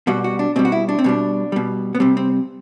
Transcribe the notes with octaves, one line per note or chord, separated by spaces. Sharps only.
B2 G3 F#4
F#4
D4
B2 G3 C4
F#4
E4
D4
C4
B2 G3 D4
B2 G3
B3
C3 G3 C4
C4